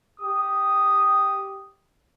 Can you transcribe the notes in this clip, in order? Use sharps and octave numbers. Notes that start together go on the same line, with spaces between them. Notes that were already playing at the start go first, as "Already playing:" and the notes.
G4 D#6